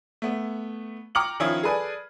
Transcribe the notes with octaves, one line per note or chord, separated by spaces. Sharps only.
A3 B3
G5 A#5 D6 F6 C#7 F#7
D#3 F3 C#4 E4 F4
G#4 A4 B4 D5 G#5